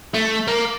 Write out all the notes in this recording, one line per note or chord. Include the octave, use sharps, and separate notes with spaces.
A3
A#3